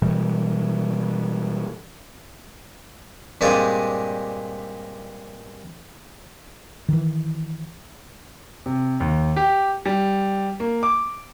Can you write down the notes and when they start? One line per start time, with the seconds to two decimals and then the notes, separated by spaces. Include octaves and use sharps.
0.02 B2 E3 G3
3.41 G2 A#2 G#3 C4 G#4 D5
6.89 D#3 E3
8.66 C3
9.00 D#2
9.36 G4
9.86 G3
10.60 A#3
10.83 D6